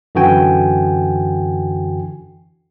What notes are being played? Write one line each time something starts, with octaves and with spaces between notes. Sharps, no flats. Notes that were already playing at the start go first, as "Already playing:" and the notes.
F#2 D3 E3 F#4 G5 G#5